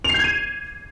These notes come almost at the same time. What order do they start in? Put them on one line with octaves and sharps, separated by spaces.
F7 C7 G6 G#6 D#7